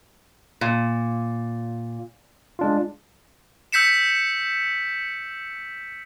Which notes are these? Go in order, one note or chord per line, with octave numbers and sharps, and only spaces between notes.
A#2
G#3 D4 F4
E6 G6 B6 C#7 E7